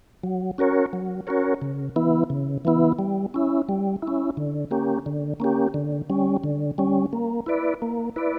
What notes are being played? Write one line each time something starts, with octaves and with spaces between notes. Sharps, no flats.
F#3
C#4 F#4 A#4 C#5
F#3
C#4 F#4 A#4 C#5
C#3
E3 B3 E4
C#3
E3 B3 E4
G3
C#4 E4
G3
E4
C#4
D3
A#3 C#4 G4
D3
A#3 C#4 G4
D3
G3 C#4
D3
G3 C#4
A#3
E4 B4 D5
A#3
E4 B4 D5